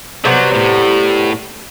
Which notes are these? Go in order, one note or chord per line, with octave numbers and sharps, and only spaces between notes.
C3 F#3 G3 B3
A2